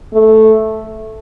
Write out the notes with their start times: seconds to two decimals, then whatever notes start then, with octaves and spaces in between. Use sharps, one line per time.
0.14 A3